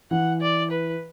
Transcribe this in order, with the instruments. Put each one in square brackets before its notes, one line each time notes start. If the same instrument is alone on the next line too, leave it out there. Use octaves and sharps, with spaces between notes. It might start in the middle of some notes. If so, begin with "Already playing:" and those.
[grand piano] E3 [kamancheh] F#5
[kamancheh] D5
B4